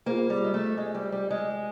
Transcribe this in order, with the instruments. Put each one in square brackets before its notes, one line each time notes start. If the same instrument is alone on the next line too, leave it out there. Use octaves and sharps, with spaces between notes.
[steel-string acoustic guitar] A#3 [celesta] F4 G#4 C5
[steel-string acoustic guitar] G3
G#3
A3
G#3
G3
G3
G#3